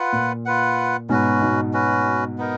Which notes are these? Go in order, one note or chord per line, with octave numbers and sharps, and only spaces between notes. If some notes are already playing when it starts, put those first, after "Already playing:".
Already playing: F4 B4 F#5
A#2
F4 B4 F#5
G#2 B2 C#4 F#4 B4
G#2 B2
C#4 F#4 B4
B3 D#4 A#4